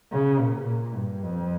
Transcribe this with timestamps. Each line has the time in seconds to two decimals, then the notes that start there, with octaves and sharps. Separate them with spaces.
0.12 C#3
0.39 A#2
0.67 A#2
0.95 G2
1.23 F2